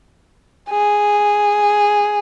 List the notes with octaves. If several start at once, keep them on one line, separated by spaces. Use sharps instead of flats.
G#4